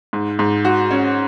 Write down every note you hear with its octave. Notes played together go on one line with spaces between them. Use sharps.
G#2
G#2
F#4
C#4